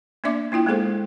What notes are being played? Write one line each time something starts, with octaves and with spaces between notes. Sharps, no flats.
A#3 B3 D4 D5 E5 D6
A#3 E4 F4 G5
G#3 A#3 B3 G#4 A4 C5